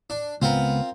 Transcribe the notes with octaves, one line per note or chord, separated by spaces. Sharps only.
D4
C#2 B3 C4 F4 A#4